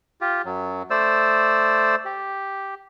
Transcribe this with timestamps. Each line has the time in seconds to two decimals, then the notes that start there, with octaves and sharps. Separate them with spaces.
0.21 F4 G4
0.45 F#2 F#3
0.90 A3 C5 D5 E6
2.05 G4